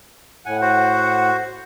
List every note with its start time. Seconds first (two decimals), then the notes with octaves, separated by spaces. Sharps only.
0.46 A2 F#5 G#5
0.61 F#4 C5